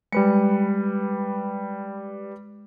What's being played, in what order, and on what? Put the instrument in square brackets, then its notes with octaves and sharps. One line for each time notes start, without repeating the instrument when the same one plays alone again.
[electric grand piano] G3 B4 C#7 [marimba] G#3